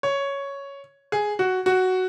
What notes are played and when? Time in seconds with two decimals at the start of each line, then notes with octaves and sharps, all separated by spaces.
0.03 C#5
1.12 G#4
1.39 F#4
1.66 F#4